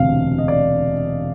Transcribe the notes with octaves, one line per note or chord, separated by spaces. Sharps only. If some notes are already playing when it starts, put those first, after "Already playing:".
Already playing: E1 D2 C3 F5
D#5
D5